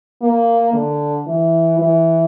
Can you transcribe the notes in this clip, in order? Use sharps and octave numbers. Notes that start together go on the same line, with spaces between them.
A#3
D3
E3
E3